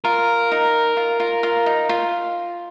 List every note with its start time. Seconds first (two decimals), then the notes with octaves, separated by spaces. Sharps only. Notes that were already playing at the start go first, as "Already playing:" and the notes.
0.05 F4 A#4
0.52 D#4
0.97 F4
1.20 F4
1.43 F4
1.66 D#4
1.89 F4